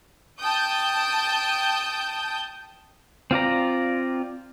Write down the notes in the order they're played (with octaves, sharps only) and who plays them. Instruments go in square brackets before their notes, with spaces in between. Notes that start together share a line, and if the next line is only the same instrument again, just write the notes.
[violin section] G5 A5 D#6 G6
[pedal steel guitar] C4 F4 D5 A#5